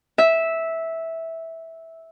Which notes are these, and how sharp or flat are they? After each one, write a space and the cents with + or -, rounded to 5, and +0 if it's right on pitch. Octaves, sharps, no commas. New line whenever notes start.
E5 -10